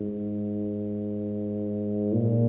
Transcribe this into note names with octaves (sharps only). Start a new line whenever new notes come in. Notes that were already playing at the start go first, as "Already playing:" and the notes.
Already playing: G#2
A#2